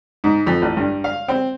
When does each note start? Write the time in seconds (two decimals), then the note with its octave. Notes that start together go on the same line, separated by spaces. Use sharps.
0.24 G#2
0.47 F2
0.62 A1
0.77 G2
1.04 F5
1.28 C4